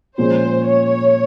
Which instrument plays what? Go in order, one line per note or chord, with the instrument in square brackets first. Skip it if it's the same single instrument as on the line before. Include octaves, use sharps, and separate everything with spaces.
[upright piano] A#2 F3 G#3 C#4 [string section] C5
[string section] C#5